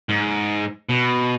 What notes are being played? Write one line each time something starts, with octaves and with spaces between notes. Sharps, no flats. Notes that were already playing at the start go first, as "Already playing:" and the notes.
G#2
B2